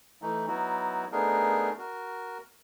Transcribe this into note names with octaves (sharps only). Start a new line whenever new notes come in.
E3 A3 D#4
F#3 B3 D#4 E4 F#4
A3 B3 D4 D#4 G#4 A#4
F#4 A#4